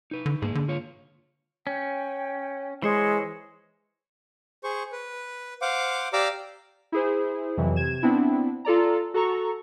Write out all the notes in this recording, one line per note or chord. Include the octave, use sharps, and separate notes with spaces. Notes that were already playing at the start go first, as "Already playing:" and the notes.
D#4 B4
D3
G#2 A#3 G#4
D3
F4 C#5 F5
C#4 G5
E3 G#3 C5 C#5
G#4 C5 C#6
B4
C5 F5 F#5 D6
G4 D5 F5 A#5 D6 E6
E4 G#4 C5
F2 C3 E3 F#3
C3 G#6 E7
B3 C4 D4 E4
F4 A4 D5 A#5
F#4 A4 A#5 C#6